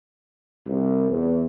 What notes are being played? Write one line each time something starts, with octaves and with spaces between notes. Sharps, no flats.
C2
E2